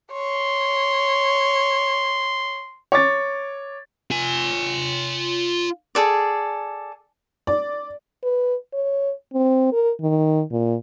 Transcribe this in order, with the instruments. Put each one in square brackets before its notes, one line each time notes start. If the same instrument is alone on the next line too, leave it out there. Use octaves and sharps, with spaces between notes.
[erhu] C#5 [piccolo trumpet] C6
[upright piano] C#5 D6 A6
[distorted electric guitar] F4 G#5
[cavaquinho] G#4 A4 D5
[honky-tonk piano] D5
[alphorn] B4
C#5
C4
A#4
D#3
A#2